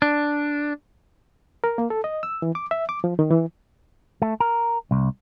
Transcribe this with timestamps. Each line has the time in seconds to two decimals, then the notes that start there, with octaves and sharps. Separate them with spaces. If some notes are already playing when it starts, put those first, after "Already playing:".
0.02 D4
1.64 A#4
1.78 A#3
1.90 A4
2.04 D#5
2.23 E6
2.42 E3
2.55 D6
2.71 E5
2.89 D6
3.04 F3
3.19 D#3
3.31 E3
4.22 A3
4.40 A#4
4.91 C2